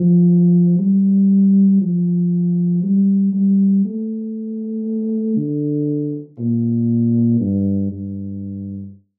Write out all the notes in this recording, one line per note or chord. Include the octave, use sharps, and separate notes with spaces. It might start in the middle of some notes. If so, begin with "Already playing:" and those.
Already playing: F3
G3
F3
G3
G3
A3
D3
A#2
G2
G2